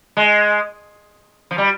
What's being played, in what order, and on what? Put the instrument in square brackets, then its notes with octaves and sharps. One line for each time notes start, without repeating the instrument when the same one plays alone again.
[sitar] G#3
F3
G3